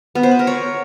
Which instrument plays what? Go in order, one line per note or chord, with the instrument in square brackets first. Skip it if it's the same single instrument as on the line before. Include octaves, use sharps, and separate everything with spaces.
[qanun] B3
C5
B4
A#4
C#5